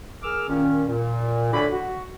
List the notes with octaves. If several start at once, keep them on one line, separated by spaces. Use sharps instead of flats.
G#4 A#4 D6 E6 F6
A#2 D#3 C#4
A#2
A2 D3 F#4 D5 G#5 B5
F#4